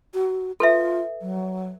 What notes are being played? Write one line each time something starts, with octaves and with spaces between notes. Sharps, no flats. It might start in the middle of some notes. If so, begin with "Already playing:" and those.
F#4
F4 A4 B4 E5
F#3